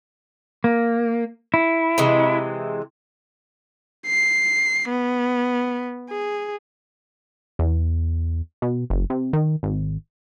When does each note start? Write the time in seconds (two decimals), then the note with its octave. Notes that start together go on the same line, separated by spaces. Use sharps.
0.64 A#3
1.54 E4
1.98 C3 E3 G#3
4.07 C7
4.89 B3
6.10 G#4
7.59 E2
8.62 B2
8.90 F#1
9.10 C3
9.33 D#3
9.63 G#1